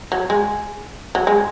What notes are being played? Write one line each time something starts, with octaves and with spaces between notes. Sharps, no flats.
F#3
G#3
F#3
G#3